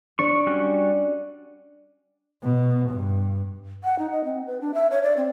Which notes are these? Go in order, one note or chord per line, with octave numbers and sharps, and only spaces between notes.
D4 D5 C#6
G3 C#4 F#4
B2
G2
F#5
D#4
D#5
C4
B4
D4
E5
C#5
D5
C4